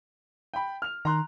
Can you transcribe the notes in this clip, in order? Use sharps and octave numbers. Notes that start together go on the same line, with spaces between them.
G5 B5
F6 F7
D#3 A#5 C6 F#6